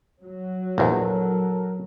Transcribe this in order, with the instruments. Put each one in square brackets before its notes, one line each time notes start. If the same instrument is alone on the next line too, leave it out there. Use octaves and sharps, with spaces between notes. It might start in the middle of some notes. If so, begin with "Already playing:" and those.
[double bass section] F#3
[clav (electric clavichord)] A#1 E2 [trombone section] A4 A#4